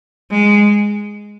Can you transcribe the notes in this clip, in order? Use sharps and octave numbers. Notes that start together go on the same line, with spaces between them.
G#3